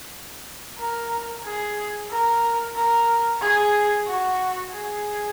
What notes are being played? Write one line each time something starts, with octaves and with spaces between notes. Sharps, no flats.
A#4
G#4
A#4
A#4
G#4
F#4
G#4